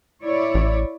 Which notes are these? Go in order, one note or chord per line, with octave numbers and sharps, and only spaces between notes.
E4 C#5 D5
A1